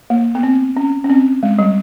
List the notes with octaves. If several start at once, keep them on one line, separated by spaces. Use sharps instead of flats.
A#3
B3
C4
C#4
C#4
C4
G#3
G3